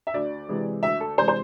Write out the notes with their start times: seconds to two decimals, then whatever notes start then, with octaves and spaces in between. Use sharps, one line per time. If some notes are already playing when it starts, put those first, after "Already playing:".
0.07 E5
0.14 D2 D5
0.49 C3 E3 G#3
0.83 D2 E5
1.00 A4
1.18 C3 E3 G#3 C5
1.28 C5